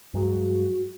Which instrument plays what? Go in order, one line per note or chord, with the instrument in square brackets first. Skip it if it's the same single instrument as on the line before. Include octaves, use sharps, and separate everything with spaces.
[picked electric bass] G2 F#3 G#3 [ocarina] F#4